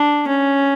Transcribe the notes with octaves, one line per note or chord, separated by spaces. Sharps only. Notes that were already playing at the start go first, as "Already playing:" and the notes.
Already playing: D4
C#4